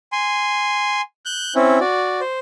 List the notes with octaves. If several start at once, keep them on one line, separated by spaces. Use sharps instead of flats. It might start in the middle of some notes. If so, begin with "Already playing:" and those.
G#5 C6
F#6 G6
C4 C#4 E4
F#4 D5
C5